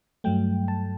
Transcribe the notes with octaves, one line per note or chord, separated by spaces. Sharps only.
G2 F#3 A3 G5
A5